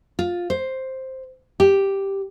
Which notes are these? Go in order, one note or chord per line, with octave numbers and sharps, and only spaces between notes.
F4
C5
G4